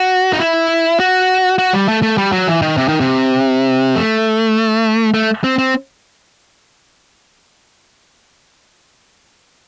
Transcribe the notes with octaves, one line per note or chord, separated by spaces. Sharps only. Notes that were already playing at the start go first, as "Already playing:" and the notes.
Already playing: F#4
D#4
E4
F#4
F#4
G3
A3
A3
G3
F#3
E3
D#3
C3
D#3
C3
A3
A3
C4
C4